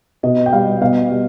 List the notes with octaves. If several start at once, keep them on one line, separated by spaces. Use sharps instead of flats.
B2 D#5
G5
G3 F5
B2 F5
G3